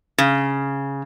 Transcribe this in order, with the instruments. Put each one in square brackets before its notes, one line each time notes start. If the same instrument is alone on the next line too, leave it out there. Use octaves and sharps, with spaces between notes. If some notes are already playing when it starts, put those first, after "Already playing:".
[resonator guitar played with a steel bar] C#3